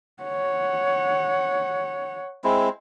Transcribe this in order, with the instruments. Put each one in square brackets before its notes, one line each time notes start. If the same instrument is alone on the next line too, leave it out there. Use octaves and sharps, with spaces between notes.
[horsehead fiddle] C#5 F#5
[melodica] G#3 C4 E4